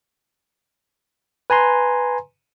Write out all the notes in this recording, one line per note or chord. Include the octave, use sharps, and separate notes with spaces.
B4 G#5 A#5 C6